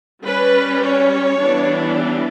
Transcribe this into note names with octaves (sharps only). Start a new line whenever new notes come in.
G3 C#4 B4
C#5
E3 G3 B3 D4